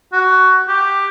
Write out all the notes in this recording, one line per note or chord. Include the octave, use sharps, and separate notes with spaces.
F#4
G4